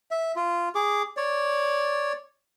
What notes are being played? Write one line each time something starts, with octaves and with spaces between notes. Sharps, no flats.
E5
F4
G#4 D6
C#5 D5